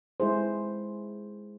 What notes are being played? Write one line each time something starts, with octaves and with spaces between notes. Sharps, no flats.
G#3 E4 G#4 C5